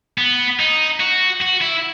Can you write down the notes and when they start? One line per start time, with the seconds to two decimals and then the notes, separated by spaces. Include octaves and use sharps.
0.18 B3
0.60 D#4
1.00 F#4
1.42 F#4
1.62 E4